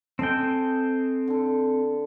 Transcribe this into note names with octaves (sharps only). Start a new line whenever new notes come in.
C4 A4 D#5 G5 G#5
D3 A4